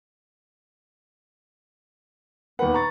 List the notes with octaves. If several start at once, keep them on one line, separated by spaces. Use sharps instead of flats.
D#2 B3 B4 F#5
A#5 C#6 A6